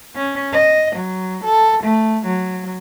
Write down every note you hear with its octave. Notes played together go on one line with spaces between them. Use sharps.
C#4
D#5
F#3
A4
A3
F#3